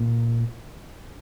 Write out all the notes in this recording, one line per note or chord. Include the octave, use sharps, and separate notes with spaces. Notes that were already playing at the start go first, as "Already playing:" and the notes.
Already playing: A#2